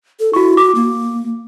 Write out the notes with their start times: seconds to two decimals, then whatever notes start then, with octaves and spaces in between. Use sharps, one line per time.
0.20 A4
0.33 E4 F#4 C#6
0.57 F#4 D6
0.75 A#3